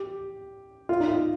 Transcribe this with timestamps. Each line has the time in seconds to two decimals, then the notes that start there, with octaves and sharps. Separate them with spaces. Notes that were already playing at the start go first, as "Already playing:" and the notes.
Already playing: G4
0.89 F4
1.00 D#4
1.08 F4